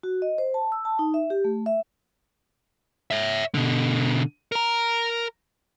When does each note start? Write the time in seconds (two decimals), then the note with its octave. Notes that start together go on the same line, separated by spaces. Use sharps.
0.03 F#4
0.22 D#5
0.38 C5
0.54 A5
0.72 E6
0.85 A5
0.99 D#4
1.14 E5
1.30 G4
1.45 A3
1.66 E5
3.11 C#5 E5
3.54 B2 D3
4.52 A#4 A#5